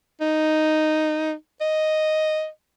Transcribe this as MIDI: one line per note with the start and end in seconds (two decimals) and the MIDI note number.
0.21 1.33 63
1.61 2.47 75